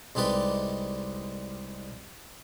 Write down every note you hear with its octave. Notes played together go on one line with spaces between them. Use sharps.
C2 G#3 D#4 G4 B4 D5